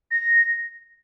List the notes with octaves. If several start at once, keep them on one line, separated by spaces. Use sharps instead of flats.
A#6